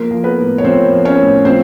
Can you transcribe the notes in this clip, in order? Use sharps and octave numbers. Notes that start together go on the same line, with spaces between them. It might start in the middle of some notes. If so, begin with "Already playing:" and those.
Already playing: F3 A#3 A#4
F3
B3 B4
A2
C#5
F3 C4 C5
F3
C#4 C#5
A2
F3 C4 C5